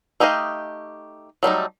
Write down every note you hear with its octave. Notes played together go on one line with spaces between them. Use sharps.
A3 D#4 G4 D#5 F5
F#3 G3 A3 D#4